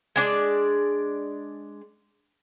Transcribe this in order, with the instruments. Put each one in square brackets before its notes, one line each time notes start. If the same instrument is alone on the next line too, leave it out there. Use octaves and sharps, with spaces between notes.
[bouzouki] G#3 D4 D5